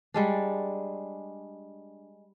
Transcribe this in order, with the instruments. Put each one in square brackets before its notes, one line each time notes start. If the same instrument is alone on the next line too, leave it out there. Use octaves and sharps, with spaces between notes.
[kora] G3 G#3 D4